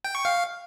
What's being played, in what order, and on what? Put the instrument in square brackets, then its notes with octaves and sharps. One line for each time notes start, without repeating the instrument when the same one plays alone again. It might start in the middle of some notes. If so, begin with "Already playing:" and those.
[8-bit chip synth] G5
C#6
F5